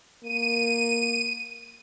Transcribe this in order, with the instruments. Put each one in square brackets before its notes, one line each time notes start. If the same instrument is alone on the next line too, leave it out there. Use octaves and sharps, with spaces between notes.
[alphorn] A#3 [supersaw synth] D#7